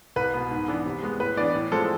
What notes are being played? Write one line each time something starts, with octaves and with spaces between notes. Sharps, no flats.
C2 B4
B2 B3
G#2
E3 B3 D4
C3
G#3 B3
A2 B4
E3 B3 D4 D5
A2
F3 G#3 C4 A4